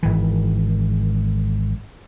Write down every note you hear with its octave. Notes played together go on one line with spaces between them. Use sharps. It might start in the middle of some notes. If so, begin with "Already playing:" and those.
G#1 E3